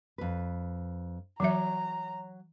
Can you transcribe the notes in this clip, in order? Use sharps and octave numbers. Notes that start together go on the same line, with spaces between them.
F2 B4
E3 F#3 C#5 E5 A#5